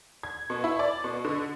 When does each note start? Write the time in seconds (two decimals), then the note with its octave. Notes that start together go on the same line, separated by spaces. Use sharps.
0.23 G#6
0.50 B2
0.64 E4
0.79 D5
1.04 B2
1.25 D3